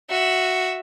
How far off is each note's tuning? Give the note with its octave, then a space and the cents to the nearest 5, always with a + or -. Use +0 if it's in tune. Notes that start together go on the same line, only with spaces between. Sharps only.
F#4 +0 E5 +0